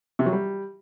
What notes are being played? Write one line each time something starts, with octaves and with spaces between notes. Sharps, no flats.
C3
F#3
G3